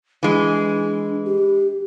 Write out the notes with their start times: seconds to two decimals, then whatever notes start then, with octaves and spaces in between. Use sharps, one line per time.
0.23 E3 G#3 D4
1.25 G4